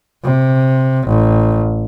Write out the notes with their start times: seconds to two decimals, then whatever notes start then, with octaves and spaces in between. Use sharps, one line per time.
0.24 C3
1.07 A1